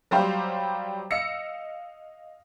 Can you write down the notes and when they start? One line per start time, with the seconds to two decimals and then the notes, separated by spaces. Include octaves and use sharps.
0.11 F#3 G3 G4 C5 F5
1.11 D#5 F5 E6 A#6 C#7